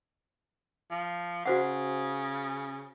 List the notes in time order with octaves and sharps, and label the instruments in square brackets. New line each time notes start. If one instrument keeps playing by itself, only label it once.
[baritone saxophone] F3
[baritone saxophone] C#3 [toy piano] F#4 C5 F#5